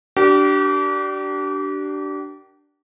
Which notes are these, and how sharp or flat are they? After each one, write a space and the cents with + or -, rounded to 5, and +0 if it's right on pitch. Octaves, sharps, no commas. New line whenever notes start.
D4 +0 G4 -35 A#4 +5